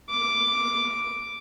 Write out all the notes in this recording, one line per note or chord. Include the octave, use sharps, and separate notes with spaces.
D6